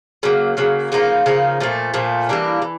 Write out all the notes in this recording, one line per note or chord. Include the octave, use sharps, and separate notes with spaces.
C#3 F#3 A#3
C#3 F#3 A#3
C#3 F3 A#3 D#4
C#3 F3 A#3 D#4
A#2 F3 A3
A#2 F3 A3
E3 G3 A#3 D4
E3